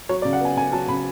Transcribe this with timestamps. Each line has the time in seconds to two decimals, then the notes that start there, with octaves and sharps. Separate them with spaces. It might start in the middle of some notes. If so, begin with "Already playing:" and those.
0.09 F#3 C#5
0.22 D5
0.25 C#3
0.33 F#5
0.41 B3 G#5
0.57 C#3 G#5
0.72 F#3 A5
0.88 C#3 B5